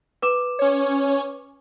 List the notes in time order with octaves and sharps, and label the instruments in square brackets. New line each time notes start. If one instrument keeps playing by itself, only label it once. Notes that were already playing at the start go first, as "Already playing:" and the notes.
[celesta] B4 D6 E7
[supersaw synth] C#4 C#5